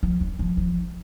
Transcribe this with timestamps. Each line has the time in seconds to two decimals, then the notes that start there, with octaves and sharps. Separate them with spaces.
0.03 F3
0.21 F#3
0.39 F3
0.57 F3